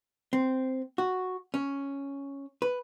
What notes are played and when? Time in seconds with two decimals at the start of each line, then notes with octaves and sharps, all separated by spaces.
0.33 C4
0.98 F#4
1.54 C#4
2.62 B4